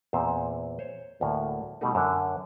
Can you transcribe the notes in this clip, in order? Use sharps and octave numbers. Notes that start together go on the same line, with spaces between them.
E2 A#2 C4 C5
C5 C#5
D2 A2 A#3
B2 G3 A3 D#4
F#2 D3